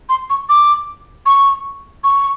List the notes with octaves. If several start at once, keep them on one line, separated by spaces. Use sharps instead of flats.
C6
C#6
D6
C#6
C#6